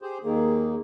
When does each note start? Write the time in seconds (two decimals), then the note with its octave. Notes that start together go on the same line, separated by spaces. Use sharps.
0.02 G4 G#4 C5
0.24 D#2 D#3 A#3 G#4